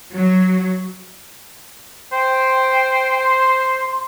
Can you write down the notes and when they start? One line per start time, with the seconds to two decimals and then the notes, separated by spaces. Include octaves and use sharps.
0.15 F#3
2.12 C5 G5
3.24 C6